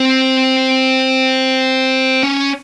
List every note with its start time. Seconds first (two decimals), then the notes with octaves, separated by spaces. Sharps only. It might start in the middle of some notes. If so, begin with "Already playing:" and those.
Already playing: C4
2.23 C#4